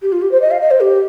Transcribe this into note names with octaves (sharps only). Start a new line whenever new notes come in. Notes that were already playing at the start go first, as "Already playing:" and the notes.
G4
F4
G4
C5
D#5
F5
D#5
C5
G4